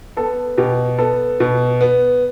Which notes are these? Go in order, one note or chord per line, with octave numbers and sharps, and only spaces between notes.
B3 A4
B2 G4
B3 A4
B2
B3